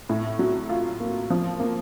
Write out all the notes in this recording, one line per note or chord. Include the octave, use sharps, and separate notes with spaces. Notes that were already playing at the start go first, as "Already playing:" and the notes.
A2
F#3
F4
A#3
F3
A#3